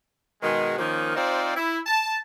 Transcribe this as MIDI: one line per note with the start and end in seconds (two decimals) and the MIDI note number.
0.42 0.78 47
0.42 0.78 51
0.42 0.78 56
0.79 1.15 51
0.79 1.15 53
0.79 1.15 58
0.79 1.15 61
0.79 1.15 63
1.16 1.56 60
1.16 1.56 63
1.16 1.56 65
1.16 1.56 72
1.16 1.56 74
1.57 1.80 64
1.87 2.19 81